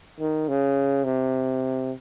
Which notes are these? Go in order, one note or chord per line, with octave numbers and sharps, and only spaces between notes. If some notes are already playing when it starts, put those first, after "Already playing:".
D#3
C#3
C3